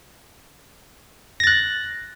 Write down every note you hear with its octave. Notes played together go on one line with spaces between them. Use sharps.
F#6 A6 A#6